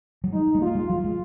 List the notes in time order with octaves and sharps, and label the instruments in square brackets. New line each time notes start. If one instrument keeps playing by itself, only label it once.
[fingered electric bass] F#3
[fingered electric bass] G#3 [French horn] D#4
[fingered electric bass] G#3
[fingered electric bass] A#3 [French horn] F4
[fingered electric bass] G#3
[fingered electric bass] F#3 [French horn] F4
[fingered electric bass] G#3